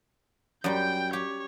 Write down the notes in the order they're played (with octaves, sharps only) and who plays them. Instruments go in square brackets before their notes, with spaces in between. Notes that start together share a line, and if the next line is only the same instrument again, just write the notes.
[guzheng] F#2 G3 [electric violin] G5 G6
[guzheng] G4 [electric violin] C#5